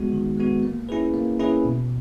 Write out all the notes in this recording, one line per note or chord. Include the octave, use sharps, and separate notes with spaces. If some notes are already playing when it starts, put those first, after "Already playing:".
Already playing: G#3 B3 F#4
D#3
G#3 B3 F#4
A#3
C#4 E4 G#4 B4
A#3
C#4 E4 G#4 B4
B2